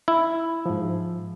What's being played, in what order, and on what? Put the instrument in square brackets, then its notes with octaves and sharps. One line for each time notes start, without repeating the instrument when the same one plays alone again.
[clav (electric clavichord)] E4
[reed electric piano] G#2 F3